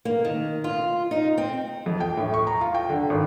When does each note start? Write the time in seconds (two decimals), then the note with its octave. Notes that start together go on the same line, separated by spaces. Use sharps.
0.05 A#3
0.25 D#3
0.64 F4
1.11 D#4
1.38 C4
1.86 F2
2.00 G5
2.17 A2
2.34 C#6
2.47 A#5
2.61 F4
2.75 G5
2.90 D3
3.10 G#1